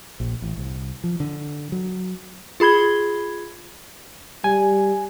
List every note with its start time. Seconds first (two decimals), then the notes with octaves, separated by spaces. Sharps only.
0.20 A#1
0.42 A1
0.58 C2
1.04 F3
1.20 D3
1.72 F#3
2.60 F4 G#4 B5 G#6 G7
4.44 G3 G#5